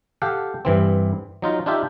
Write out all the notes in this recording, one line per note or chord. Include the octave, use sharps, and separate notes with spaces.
G4 A4 F5 F#5 A5
G2 E3 C4
F#3 D#4 F4 D#5
D4 D#4 F4 G4 E5